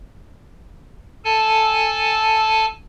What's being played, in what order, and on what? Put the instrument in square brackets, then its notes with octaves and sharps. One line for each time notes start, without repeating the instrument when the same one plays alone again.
[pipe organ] A4 G#5 A5